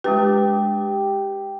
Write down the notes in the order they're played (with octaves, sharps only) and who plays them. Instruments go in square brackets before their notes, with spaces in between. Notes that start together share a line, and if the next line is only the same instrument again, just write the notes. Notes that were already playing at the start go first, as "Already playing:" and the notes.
[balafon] G#3 D4 B4 [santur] G4